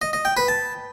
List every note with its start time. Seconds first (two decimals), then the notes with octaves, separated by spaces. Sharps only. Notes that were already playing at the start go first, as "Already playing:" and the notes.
0.02 D#5
0.13 D#5
0.25 G5
0.37 B4
0.48 A5